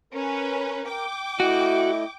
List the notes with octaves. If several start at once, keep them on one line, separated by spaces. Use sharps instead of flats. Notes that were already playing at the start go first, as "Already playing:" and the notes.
C#4 A#4 B4
G5 D6
A3 E4 F#4 D#5